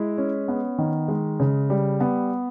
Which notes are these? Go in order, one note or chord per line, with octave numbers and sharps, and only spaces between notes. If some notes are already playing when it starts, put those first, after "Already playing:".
Already playing: G#3 E4
C#4
B3
D#3
G#3
C#3
G3
B3